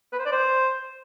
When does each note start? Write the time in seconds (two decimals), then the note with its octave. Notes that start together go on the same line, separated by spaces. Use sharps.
0.13 B4
0.19 C5
0.26 D5
0.32 C5